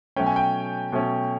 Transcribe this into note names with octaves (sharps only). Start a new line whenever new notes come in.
B2 F#3 A3 C#4 G5
G#5
G5
B2 F#3 A3 C#4